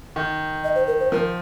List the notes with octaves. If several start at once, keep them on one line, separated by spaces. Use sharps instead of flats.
D#3
D#5
C5
A#4
C5
F3 A#4